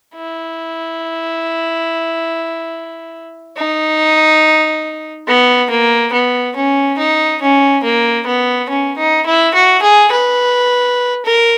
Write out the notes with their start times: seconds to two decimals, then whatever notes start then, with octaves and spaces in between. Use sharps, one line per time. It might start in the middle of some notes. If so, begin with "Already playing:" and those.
0.16 E4
3.57 D#4
5.28 B3
5.70 A#3
6.13 B3
6.56 C#4
6.98 D#4
7.42 C#4
7.84 A#3
8.26 B3
8.69 C#4
8.98 D#4
9.26 E4
9.54 F#4
9.82 G#4
10.12 B4
11.26 A#4